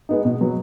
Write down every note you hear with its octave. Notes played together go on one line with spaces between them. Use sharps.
G#3 B3 D#4
B2
F#3 B3